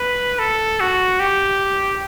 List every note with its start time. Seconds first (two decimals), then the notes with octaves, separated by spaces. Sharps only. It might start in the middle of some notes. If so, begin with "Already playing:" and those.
Already playing: B4
0.39 A4
0.80 F#4
1.20 G4